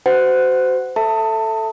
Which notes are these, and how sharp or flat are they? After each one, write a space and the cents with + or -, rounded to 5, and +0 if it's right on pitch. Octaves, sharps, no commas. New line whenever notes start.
F#4 +20 C5 -30 F#5 +0
A4 +0 E5 +0 A5 +25